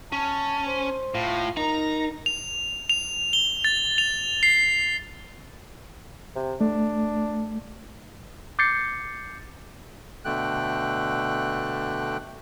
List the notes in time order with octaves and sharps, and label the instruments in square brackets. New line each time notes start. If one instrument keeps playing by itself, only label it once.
[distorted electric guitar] C#4 [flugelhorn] A5
[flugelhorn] C5
[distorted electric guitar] A2 [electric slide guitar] F4
[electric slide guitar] D#4 [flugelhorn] A#4 [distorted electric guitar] A#5
[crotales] F7
F7
G7
A6
F7
C7
[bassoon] C3
[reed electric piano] A3 [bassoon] D4
[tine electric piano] D6 G6 A6 C7 C#7
[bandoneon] B2 D3 A3 G5 F#6